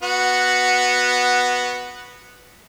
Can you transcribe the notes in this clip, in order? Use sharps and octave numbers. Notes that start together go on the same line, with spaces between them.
B3 F#4